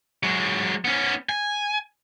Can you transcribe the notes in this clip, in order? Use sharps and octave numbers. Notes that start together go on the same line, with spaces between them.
F#3 G#3
B3 C#4
G#5